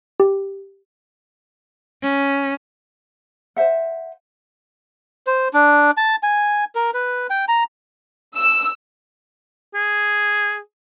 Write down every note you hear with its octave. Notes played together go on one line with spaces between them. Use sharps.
G4
C#4
C5 E5 F#5
C5
D4
A5
G#5
A#4
B4
G5
A#5
E6
G#4